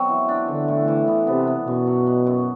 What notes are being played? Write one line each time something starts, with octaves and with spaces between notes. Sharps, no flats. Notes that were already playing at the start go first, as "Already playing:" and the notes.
Already playing: B2 F#3 C4
E3
D4
D3 E3
A2
E3
B3
C3 B3
B3
F#2 B2
F#3
B3
F#2